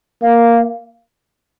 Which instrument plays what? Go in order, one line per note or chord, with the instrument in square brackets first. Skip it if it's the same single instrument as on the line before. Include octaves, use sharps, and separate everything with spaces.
[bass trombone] A#3 [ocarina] F5